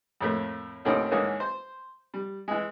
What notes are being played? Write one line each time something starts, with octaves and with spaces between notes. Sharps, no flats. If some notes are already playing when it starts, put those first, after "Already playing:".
F2 A2 A3 A#3
D#2 A2 D3 D#3 C4 C#4
G#2 D3 E3 A#3 C#4 G#4
C5
G3
E3 G#3